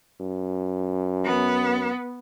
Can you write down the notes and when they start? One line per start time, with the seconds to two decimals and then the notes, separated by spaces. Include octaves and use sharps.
0.21 F#2
1.24 B3